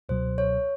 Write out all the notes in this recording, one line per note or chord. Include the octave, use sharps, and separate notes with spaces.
C#2 B2 F#3 C5
C#5